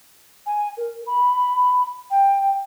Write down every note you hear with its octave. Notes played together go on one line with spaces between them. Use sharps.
G#5
A#4
B5
G5